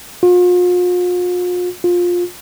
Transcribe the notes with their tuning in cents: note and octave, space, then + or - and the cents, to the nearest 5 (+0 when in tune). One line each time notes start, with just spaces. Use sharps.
F4 +40
F4 +15